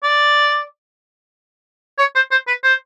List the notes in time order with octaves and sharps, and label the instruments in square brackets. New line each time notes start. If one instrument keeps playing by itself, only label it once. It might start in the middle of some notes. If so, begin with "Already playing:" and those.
[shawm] D5
C#5
C5
C5
B4
C5